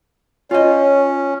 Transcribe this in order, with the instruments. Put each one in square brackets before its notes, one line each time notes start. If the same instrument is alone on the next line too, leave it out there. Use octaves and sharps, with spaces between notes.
[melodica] C#4 [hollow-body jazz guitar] F4 D#5 [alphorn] C#5